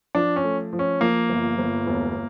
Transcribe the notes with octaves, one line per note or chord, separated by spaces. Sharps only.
F3 D4
C#4
A3
F3
C#4
F3 A#3
G1
G1
E1